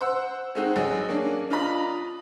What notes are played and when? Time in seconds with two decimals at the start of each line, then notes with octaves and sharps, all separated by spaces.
0.01 C5 F#5 E6
0.55 G#3 A3 C4 D#4 F#4
0.76 A1 F#3 G#4 D#5
1.09 A#3 C#4 D4 G#4
1.50 D4 F4 D#5 A#5 B5